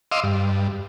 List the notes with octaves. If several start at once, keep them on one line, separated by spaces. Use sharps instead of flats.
D#5 F5 C6 D6 E6
G2